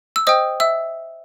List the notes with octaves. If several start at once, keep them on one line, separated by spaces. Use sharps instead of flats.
E6
C5 D#5 G5 D#6
E5 E6